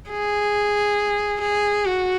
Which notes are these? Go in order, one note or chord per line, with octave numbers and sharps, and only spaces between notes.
G#4
G#4
F#4